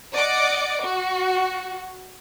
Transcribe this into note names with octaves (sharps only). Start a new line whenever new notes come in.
D5 D#5 F#5 D6
F#4